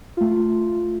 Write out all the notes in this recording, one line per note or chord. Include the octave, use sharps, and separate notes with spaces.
A3 F4